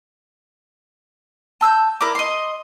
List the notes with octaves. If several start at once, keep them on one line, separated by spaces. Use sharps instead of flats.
A5 E6 F6 G6
E4 A#4 D5 D6
D#5 C6